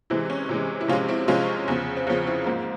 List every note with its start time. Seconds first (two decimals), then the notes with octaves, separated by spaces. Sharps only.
0.10 C3 E3 G#3 C4 E4
0.30 C#4
0.49 C3 E3 G#3 C#4
0.81 E4
0.88 C3 F3 G#3 C#4 F4
1.08 C4 E4
1.28 C3 F3 G#3 C#4 F4
1.68 E2 C#3 F3
1.97 C4
2.07 E2 C#3 F3 C#4
2.26 C4 E4
2.46 G#2 F3 A#3 C4